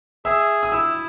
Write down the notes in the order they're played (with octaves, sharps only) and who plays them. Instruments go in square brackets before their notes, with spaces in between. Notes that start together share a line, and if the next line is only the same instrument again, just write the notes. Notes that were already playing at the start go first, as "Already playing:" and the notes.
[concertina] G#4 [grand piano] E5 E6
[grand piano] D#6
[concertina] E4 [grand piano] E5 E6